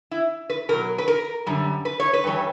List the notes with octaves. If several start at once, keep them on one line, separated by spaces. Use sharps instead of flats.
E4
B4
B2 F#3 A#4
B4
A#4
F#2 D3 G3
B4
C#5
B4
G2 E3 G3 C#5